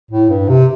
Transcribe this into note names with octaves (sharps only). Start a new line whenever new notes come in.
A2
G2
C3